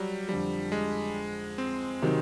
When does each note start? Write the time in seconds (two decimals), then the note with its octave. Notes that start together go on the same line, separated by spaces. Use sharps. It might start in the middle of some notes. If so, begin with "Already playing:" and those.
Already playing: F#3 G3
0.29 F2 D3 F3 G3
0.72 G#3
1.58 C4
2.02 C3 D#3 F#3